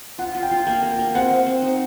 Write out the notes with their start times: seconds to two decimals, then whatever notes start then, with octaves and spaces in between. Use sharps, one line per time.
0.18 F4 F#5
0.35 F4
0.43 G5
0.51 F4
0.67 A#3 G5
0.83 A#3
0.91 G5
0.99 A#3
1.15 C4 F#5
1.31 C4
1.46 C4
1.62 D#4